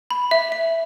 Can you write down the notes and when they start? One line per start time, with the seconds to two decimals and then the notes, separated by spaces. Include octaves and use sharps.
0.11 B5
0.31 E5
0.52 E5